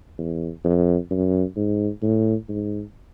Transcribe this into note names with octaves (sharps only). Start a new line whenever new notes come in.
E2
F2
F#2
G#2
A2
G#2